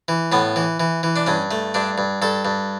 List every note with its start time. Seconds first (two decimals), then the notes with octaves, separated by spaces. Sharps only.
0.08 E3
0.32 A2 B3
0.56 E3
0.80 E3
1.03 E3
1.16 D4
1.27 G2 C#4
1.51 A3
1.74 G2 D4
1.98 G2
2.22 G2 A4
2.45 G2